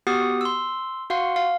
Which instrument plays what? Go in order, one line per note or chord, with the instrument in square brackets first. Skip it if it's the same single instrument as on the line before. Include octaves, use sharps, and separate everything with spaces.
[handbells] B3 F#4 G4 F#5 D#6
C6 E6
F#4 F5 F#5 C6
F5